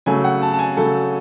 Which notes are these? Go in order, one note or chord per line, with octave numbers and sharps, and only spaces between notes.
C#3 F#3 A3 G#5
F#5
A5
A5
G#5
C#3 F#3 A3 A4